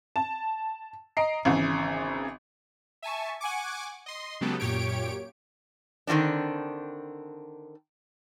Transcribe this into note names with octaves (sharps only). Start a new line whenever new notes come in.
A5
D#5 A#5 C7 D7
G#1 C#3 E3
E5 G#5 A5 C#6
F#5 G#5 C#6 D6
D#5 C6
C#3 F#3 G#3 B3 G4 A4
F#2 A#2 G4 C#5 D7
D3 D#3 F3 C4 D4